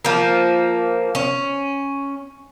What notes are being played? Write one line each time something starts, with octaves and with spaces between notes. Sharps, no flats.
F3 A#3
C#4